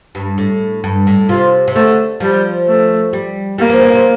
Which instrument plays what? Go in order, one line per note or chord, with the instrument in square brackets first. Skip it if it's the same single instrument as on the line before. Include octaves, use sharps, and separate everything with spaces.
[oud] G2
A2
G2
A2
[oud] C3 [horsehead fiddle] F4
[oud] C3
[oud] D3 [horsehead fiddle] A3
[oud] F3 [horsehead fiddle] G3
[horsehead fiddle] A3
[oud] G3
[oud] G3 [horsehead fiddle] A#3
[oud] F3
E3
C3